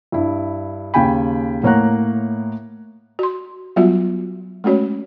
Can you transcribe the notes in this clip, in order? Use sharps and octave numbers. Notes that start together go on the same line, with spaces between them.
G2 E4
D#2 C#3 G5 G#5 B5
A2 A#3 C#5 F#5 A#5 F#6
F#4 C6
F#3 G3 B3 F4 F#4 E5
G#3 A3 C#4 F#4 C#5